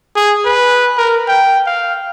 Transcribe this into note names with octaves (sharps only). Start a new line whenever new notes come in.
G#4
B4
A#4
G5
F5